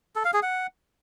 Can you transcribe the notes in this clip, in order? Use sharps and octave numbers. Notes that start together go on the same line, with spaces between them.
A4
F5
G#4
F#5